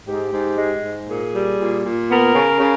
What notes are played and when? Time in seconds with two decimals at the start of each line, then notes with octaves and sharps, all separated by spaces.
0.07 G#2 G4
0.32 G#2
0.58 G#3
0.83 G#2
1.09 A#2 G#4
1.34 G3
1.59 A#2
1.85 A#2
2.10 B3 A#4
2.35 C#3
2.60 C#3